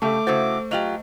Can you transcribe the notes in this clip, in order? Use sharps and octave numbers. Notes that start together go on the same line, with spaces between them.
C#3 A3 G4 A4 E5 A5 D6
C#3 E4 F#4 C5 A6
F#3 F4 G4 D#5 F7 F#7